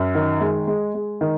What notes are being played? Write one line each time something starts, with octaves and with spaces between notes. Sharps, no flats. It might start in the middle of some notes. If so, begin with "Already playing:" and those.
Already playing: F#2
D#3
G#3
G#3
G#3
D#3